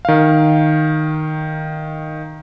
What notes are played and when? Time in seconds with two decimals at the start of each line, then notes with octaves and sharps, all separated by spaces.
0.05 D#3 F5